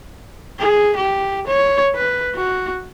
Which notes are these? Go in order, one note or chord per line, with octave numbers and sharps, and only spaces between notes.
G#4
G4
C#5
B4
F#4